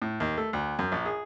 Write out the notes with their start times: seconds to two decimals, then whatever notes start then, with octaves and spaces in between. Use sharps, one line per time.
0.02 A2
0.20 D#2
0.37 A3
0.53 D2
0.79 F#2
0.92 A#1
1.06 G#4